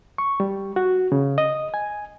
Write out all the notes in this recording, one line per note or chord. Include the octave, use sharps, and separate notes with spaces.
C#6
G3
F#4
C#3
D#5
G#5